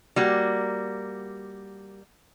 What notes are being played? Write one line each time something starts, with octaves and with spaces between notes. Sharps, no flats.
G3 A#3 F#4